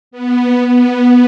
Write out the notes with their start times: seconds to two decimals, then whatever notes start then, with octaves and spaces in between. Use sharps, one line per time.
0.11 B3
0.66 B3